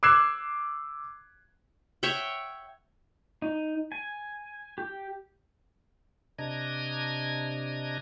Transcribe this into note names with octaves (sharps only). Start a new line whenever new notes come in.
D6 E6 F#6 G#6 C7 E7
C#5 E5 F#5 G5
D#4
G#5
G4
C3 D4 D#5 A#5 G#6